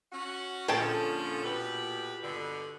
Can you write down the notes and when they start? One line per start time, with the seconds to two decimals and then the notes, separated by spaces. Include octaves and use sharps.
0.12 C#4 F#4
0.68 A#2 D3 F3 C#4 G#4 A4 G5 A5
1.43 B2 G4 B4
2.22 G2 B2 D3